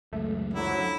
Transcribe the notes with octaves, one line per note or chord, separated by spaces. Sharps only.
C#2 F#2 A3
D3 F3 F#3 E4